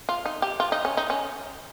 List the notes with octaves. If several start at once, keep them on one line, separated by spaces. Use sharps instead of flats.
F4
D#4
G4
F4
D#4
C#4
D#4
C#4